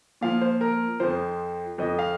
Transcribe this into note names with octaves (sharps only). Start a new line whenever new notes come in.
A#2 F3 F5
C5
A#4
F2 F3 C5
F2 F3 D#5
F5